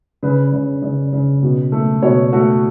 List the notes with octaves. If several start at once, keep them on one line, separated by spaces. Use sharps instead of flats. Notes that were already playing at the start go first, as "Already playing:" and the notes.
C#3 B4
C#3
C#3 D5
C#3
B2
A3
B2 C#5
A3 F#4